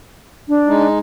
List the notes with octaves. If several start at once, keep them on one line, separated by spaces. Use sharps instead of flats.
D4
G#3 D#4